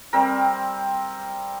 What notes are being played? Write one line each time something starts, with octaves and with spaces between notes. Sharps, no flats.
G3 C4 A#4